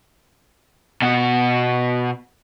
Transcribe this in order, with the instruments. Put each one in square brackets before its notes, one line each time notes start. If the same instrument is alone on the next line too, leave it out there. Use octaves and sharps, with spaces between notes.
[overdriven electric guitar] B2 F#4